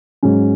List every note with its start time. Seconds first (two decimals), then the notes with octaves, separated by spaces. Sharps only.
0.23 G#2 F#3 C#4